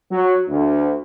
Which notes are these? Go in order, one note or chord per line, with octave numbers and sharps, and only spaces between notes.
F#3
D2